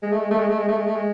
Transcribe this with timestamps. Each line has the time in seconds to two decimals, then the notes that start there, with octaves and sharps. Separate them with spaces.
0.03 G#3
0.12 A3
0.21 G#3
0.31 A3
0.39 G#3
0.49 A3
0.59 G#3
0.68 A3
0.77 G#3
0.87 A3
0.96 G#3